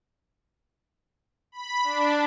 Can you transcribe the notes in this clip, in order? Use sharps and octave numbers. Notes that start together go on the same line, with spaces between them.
B5
D4